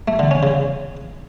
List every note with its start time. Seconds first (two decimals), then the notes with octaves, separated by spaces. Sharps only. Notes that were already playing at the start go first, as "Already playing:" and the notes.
0.08 A3
0.19 D3
0.31 C#4
0.43 C#3